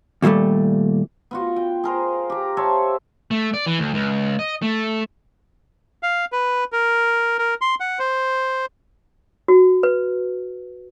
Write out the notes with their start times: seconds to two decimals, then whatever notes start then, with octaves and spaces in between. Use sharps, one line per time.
0.22 D#2 A#2 F3 G3 A3
1.31 B3 F4 F#4
1.56 G5
1.84 G#4 A#4 C5
2.30 G4 A#5
2.57 C5 C#5 E5 A5
3.31 A3
3.54 D5
3.66 E3
3.79 D2
3.94 C#2
4.39 D#5
4.62 A3
6.03 F5
6.32 B4
6.72 A#4
7.39 A#4
7.61 C6
7.80 F#5
7.99 C5
9.48 F#4
9.83 B4